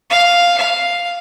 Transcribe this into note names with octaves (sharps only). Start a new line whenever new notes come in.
F5
F5